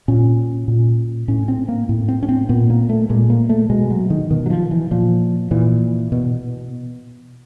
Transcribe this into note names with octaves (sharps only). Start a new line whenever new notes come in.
A#2 C#4
A#2
A2 C#4
C4
A#3
A2
C4
C#4
C4
A#2 B3
A#3
A3
A#2 G#3
A#3
A3
B2 G#3
F#3
D#3
B2 D#3
F#3
F3
E3
A#2 F3
A#2 E3
B2